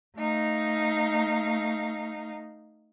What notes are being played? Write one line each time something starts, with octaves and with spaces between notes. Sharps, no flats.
A3 D#4 F5